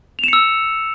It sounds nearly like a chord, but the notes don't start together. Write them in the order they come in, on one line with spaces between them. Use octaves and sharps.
F7 E7 C#7 E6